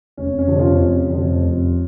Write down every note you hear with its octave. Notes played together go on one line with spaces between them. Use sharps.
F1 C#4
C#4
F2 C3 F3
C#4 F4
F1
F2 C3 F3
F1